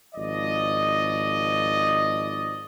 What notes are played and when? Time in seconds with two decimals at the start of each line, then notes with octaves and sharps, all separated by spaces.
0.15 G#1 F3 D5 D#5